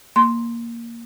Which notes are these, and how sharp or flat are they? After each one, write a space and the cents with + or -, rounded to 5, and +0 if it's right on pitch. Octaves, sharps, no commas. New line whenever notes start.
A#3 +0 C6 +0